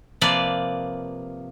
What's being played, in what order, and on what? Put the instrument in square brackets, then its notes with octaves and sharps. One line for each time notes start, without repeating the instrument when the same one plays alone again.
[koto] C3 F3 A#3 B4 D5